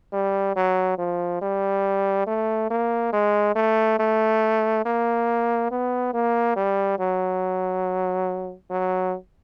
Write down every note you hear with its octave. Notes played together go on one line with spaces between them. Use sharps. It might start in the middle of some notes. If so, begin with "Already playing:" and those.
G3
F#3
F3
G3
A3
A#3
G#3
A3
A3
A#3
B3
A#3
G3
F#3
F#3